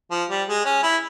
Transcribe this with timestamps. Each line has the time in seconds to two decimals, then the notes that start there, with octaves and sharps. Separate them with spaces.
0.11 F3
0.30 G3
0.48 G#3
0.66 C#4
0.83 E4